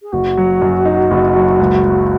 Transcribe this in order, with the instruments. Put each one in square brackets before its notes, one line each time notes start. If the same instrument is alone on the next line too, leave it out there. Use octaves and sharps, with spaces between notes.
[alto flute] G#4
[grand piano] F#1 [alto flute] F#4
[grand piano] F#3
F#2
D#4
F#1
F#3
C#2
F#3